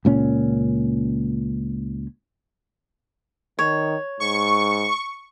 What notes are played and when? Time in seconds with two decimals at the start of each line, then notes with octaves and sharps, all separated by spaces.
0.05 C#2 A#2 C#4
3.59 D#3 C#5
4.20 G#2 C#6